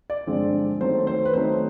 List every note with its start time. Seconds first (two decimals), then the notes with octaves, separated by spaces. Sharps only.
0.10 D5
0.27 G2 D3 F3 G#3 C4
0.80 D#3 F#3 A3 C4 D#4 C5
1.07 C5
1.25 B4
1.33 D#3 F#3 A3 C4 D#4 C5